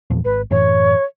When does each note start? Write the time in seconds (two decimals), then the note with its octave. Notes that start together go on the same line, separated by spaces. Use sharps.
0.10 E2 A#2 F3
0.25 G#1 B4
0.51 F#2 A2 E3 C#5